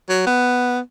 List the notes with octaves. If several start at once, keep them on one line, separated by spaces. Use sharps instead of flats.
F#3
B3